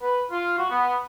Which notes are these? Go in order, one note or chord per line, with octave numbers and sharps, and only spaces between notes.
B4
F4
F#4
B3